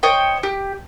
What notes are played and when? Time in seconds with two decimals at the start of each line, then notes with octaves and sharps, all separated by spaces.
0.03 C5 C#5 D#5 G5
0.43 G4